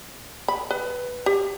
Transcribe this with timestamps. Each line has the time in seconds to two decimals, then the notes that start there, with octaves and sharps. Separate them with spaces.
0.48 B5
0.71 B4
1.26 G4